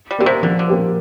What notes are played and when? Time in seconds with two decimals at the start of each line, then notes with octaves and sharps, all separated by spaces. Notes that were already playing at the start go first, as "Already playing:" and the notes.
0.11 G3
0.18 D3 A#3 G4
0.26 C3
0.43 D3 F3
0.59 D3
0.68 A#3 G4 C5